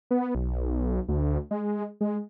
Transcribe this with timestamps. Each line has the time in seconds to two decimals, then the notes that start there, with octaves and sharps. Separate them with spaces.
0.11 B3
0.35 B1
1.08 D2
1.51 G#3
2.01 G#3